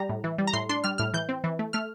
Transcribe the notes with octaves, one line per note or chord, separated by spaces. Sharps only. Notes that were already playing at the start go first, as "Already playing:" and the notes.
Already playing: G3 A#5
A2
E3
G3
A#5
A2 C6
D4 C6
G3 F6
A2 F6
E3 G6
C4
E3
A3
A3 F6